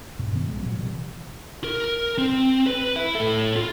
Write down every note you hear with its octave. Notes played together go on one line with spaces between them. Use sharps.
G2 B2
G#2 D#3 B3 C#4
C2 G#3
A#2 F#3
C3 E3 G3
A#4
C4
B4
E4 E5
A2 A4
F4